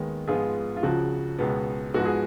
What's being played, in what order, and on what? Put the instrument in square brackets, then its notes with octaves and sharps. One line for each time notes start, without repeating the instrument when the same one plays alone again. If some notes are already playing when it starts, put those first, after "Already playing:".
Already playing: [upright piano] D#2 D#3 G#3 B3
G#2 F3 G#3 B3 F4 G#4
F4
C#2 C#3 F3 F#4
C#2 B2 G#3 B3
G#2 F3 G#3 B3 F#4
G#4